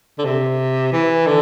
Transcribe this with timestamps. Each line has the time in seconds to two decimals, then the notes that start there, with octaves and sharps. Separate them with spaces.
0.18 D3
0.25 C3
0.93 E3
1.27 D3